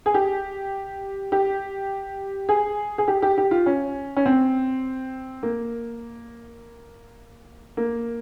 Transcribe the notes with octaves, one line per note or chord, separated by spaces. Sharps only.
G#4
G4
G4
G#4
G#4
G4
G4
G4
F4
C#4
C#4
C4
A#3
A#3